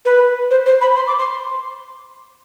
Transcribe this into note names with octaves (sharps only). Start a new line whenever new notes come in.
B4
C5
C5
B5
C6
D6
C6